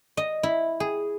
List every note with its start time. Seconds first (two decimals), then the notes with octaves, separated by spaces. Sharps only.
0.17 D#5
0.43 E4
0.80 G#4